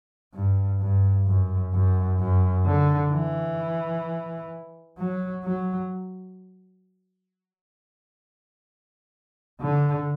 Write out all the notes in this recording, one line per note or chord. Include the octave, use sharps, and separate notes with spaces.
G2
G2
F#2
F#2
F#2
D3
E3
F#3
F#3
D3